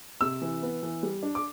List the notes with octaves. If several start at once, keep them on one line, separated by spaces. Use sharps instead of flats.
C3 E6
E3
B3
E3
G3
D4
D6